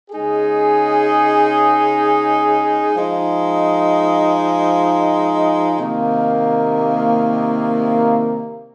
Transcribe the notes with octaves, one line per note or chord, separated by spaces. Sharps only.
C#3 G#3 D#4 G#4
F3 G#3 D#4
C3 D#3 A#3